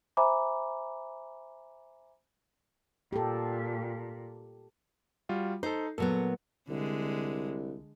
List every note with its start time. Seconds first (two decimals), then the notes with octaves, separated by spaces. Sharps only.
0.17 C5 E5 G#5 A#5 B5 D6
3.13 A#2 G4 A4
5.29 G3 F4 F#4
5.63 D#4 A4 C5
5.98 A#2 F#3 B3 A4
6.69 C2 D3 G#3